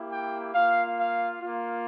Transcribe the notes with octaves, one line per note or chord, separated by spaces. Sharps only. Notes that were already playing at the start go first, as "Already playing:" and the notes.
Already playing: A#3 E4 G4
G5
A#3 F4 F5
F5
A#3 F4